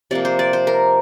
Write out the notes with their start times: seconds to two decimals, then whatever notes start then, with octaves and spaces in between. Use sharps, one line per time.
0.11 C3 F3 A#3 D5
0.25 C5
0.39 D5
0.53 C5
0.67 A#4